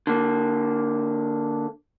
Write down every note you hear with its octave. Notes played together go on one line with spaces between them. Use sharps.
D3 A#3